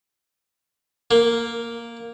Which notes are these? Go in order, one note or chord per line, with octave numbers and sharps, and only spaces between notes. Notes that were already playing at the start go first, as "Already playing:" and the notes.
A#3